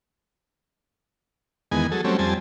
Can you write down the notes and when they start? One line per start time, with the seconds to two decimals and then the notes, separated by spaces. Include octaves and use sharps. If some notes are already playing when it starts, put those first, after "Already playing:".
1.72 E2 D#3 G#3 B3 G#5
1.92 F#3 G#4 A4
2.04 F#3 G3 A3 C4 C#4
2.19 F2 G3 C4 G#5 A5